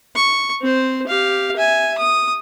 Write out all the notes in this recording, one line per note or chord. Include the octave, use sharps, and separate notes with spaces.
C#6
C4 C5
G4 F5
E5 G#5
D#6